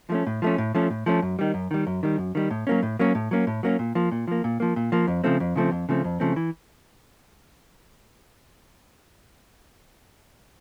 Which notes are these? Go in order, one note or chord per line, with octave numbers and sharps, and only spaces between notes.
F3 A3 C#4
A2
F3 A3 C#4
A2
F3 A3 C#4
A2
F3 A3 C#4
F#2
D#3 G3
F#2
D#3 G3
F#2
D#3 G3
F#2
D#3 G3
A2
F#3 A#3 C#4
A2
F#3 A#3 C#4
A2
F#3 A#3 C#4
A2
F#3 A#3 C#4
A#2
F3 A#3
A#2
F3 A#3
A#2
F3 A#3
A#2
F3 A#3
F2
C#3 F3 A3 C4
F2
C#3 F3 A3 C4
F2
C#3 F3 A3 C4
F2
C#3 F3 A3 C4
E3